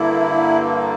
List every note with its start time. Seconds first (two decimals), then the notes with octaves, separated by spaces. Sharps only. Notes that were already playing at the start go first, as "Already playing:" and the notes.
Already playing: G2 D3 A#3 E4